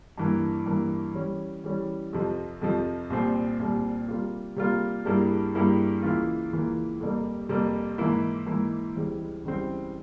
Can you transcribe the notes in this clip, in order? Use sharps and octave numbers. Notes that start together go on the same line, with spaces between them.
G2 E3 A#3
G2 E3 A#3
E3 G3 C#4
E3 G3 C#4
F2 C3 F3
F2 C3 F3
C2 A#2 G3 C4
C2 A#2 G3 C4
C3 G3 A#3 F4
C3 G3 A#3 F4
G2 G3 A#3 E4 G#4
G2 G3 A#3 E4 G#4
C#2 C#3 E3 A#3 F4
C#2 C#3 E3 A#3 F4
F2 C3 G3 A#3
F2 C3 G3 A#3
G#2 E3 A#3 E4
G#2 E3 A#3 E4
C#2 C#3 E3 G3 C4
C#2 C#3 E3 G3 C4